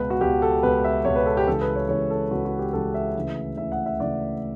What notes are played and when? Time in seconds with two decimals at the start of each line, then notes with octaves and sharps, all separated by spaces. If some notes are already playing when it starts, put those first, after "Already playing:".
Already playing: C#2 B2 B4
0.10 F#4
0.21 C#2 B2 G4
0.42 A4
0.63 C#2 B2 B4
0.84 E5
1.05 C#2 B2 C#5
1.16 B4
1.26 A4
1.37 G4
1.47 C#2 C#3 E3 A4
1.61 B4
1.75 C#5
1.89 C#2 C#3 E3 C#5
2.10 A4
2.31 C#2 C#3 E3 F#4
2.45 F#4
2.59 G4
2.73 C#2 C#3 E3 A4
2.94 E5
3.15 D2 C#3 E3
3.57 D2 C#3 E3 E5
3.72 F#5
3.86 E5
4.00 D2 C#3 E3 D5